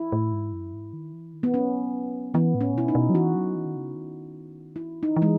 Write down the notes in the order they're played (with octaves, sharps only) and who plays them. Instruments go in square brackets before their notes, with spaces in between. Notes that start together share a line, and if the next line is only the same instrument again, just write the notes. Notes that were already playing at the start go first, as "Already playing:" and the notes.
Already playing: [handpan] E4
[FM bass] A2
G#2
F#2
G#2
D#3
E3
D#3
[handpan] B3
[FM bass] F#3 [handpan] C#4
[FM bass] E3 [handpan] B3
[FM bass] A2
[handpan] C#4
[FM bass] B2 [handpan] E4
[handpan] D#4
[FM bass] B2
F#3
[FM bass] E3 [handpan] F#4
[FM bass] F#3
E3
D#3
C#3
D#3
[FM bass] E3 [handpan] E4
[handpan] D#4
[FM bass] E3
[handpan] G#3